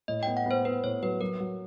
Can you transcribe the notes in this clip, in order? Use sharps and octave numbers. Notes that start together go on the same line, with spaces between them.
A2 D#5
G5
B3
F#5
B3 C5
B3 B4
A2 C#5
F#3 B4
F#3 A#4
F#3